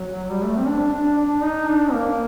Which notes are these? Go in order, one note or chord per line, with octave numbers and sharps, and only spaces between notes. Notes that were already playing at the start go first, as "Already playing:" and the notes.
Already playing: F#3
G3
A3
C4
D4
D4
D4
D#4
D4
A#3